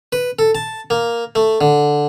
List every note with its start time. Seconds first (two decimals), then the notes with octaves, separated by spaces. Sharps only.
0.13 B4
0.39 A4
0.55 A5
0.90 A#3
1.35 A3
1.61 D3